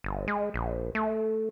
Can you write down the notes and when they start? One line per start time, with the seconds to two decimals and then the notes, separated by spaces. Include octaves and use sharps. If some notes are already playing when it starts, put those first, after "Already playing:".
0.04 G1
0.28 G#3
0.54 A#1
0.95 A3